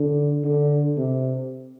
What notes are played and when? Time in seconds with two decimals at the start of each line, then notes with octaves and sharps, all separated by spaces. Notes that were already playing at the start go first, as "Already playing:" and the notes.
Already playing: D3
0.44 D3
0.97 C3